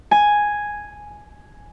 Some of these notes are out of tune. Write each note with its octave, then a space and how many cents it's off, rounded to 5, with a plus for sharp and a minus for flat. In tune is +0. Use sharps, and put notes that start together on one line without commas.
G#5 +0